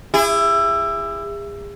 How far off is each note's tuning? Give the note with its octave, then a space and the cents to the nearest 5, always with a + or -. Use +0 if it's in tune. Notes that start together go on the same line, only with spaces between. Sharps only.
E4 +20 G#4 -40